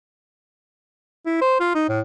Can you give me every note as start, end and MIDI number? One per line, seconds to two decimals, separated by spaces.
1.26 1.40 64
1.42 1.57 72
1.60 1.73 65
1.75 1.88 63
1.89 2.00 45